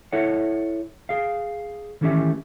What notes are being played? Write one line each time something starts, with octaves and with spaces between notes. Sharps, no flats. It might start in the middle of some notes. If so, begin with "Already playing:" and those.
E4 A4 C#5 E5 F#5
G#4 F5
D#3 E3 A3 C#4 G4 E5